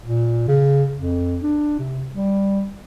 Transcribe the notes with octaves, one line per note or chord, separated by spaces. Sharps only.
A#2
C#3
F2
D4
C3
G3